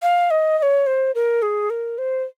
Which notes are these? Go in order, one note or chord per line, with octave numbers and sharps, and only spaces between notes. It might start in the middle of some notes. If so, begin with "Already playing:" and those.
F5
D#5
D#5
C#5
C5
A#4
G#4
A#4
C5